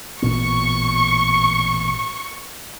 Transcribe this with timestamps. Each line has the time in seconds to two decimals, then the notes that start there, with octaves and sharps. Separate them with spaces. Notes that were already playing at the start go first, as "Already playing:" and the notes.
0.22 A1 A#2 B3 C#6